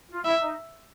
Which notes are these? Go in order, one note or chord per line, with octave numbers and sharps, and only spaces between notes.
F4
E4 E5
D#4